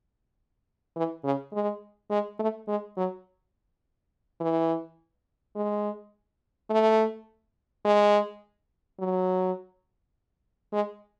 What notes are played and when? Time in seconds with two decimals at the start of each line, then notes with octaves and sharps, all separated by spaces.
0.96 E3
1.24 C#3
1.53 G#3
2.10 G#3
2.39 A3
2.68 G#3
2.97 F#3
4.40 E3
5.56 G#3
6.70 A3
7.85 G#3
9.00 F#3
10.73 G#3